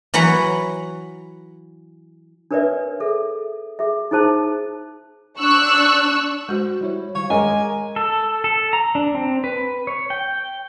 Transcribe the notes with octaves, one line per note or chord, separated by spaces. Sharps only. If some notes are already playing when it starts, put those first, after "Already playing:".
E3 F#3 B4 F#5 A#5
D4 A#4 B4 C#5 D5 E5
G#4 A4 E5
G#4 E5
D#4 E4 G#4 C5 A5
D4 C#6 E6 F#6
G#3 F#4 C5
G3 E4 C#5
D#3 C#5 F5
G#3 G#4 A#4 G#5 D6
A4
A4
A#5
D4
C4
B4
C#5
G5